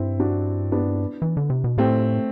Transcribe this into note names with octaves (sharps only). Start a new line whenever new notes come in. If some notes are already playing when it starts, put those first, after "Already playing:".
Already playing: G2 C4 E4
D4 F#4
B3 D4
E3
D3
C3
B2
A2 A3 C4